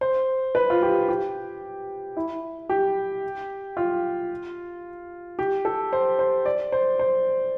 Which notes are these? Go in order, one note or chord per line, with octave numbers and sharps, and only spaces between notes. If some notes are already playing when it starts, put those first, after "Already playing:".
C5
B4
F4
G4
G4
E4
G4
F4
G4
A4
C5
C5
D5
C5
C5